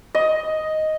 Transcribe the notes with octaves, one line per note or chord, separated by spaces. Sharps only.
D#5